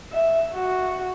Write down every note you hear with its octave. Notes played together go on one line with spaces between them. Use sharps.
E5
F#4